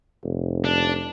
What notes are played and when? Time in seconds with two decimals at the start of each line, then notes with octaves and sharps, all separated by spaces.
0.24 F1
0.65 D4